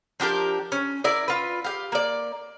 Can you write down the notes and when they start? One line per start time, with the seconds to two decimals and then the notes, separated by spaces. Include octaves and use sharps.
0.20 F3 D4 G4 A#4
0.72 C#4
1.04 E4 A#4 D5
1.28 F4 B4
1.64 G4 F5
1.92 A#3 D5